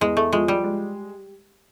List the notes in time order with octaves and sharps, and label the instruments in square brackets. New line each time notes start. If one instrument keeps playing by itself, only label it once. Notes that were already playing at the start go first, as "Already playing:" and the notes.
[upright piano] E2 [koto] G#3
[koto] A3
[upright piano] F3 [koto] G#3
[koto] G3
[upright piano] G#3